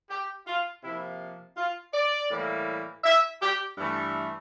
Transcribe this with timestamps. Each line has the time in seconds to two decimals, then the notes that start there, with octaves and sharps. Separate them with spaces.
0.10 G4
0.46 F4
0.83 C3 F3 A#3 E4
1.57 F4
1.94 D5
2.31 A2 E3 G3 A#3
3.04 E5
3.41 G4
3.78 G2 E3 A3